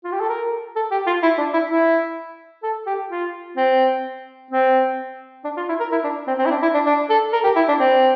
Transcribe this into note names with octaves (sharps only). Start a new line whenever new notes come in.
F4
G4
A4
A#4
A4
G4
F4
E4
D4
E4
E4
A4
G4
F4
C4
C4
D4
F4
E4
A#4
E4
D4
C4
C4
E4
D4
E4
D4
D4
A4
A#4
G4
E4
D4
C4